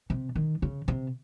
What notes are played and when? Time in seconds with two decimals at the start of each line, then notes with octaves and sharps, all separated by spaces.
0.10 C3
0.36 D#3
0.62 C#3
0.88 C3